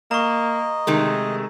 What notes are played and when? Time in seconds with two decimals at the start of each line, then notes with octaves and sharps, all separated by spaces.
0.11 A#3 D#5 A#5 C#6
0.87 C3 D#3 G#3 A3